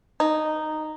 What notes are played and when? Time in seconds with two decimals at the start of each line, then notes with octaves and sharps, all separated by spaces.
0.20 D#4